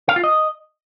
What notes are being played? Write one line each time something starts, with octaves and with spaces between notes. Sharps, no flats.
F5
F4
D#5